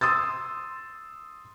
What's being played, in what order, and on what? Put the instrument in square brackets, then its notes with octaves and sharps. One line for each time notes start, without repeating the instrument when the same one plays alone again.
[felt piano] C6 D#6 E6 A6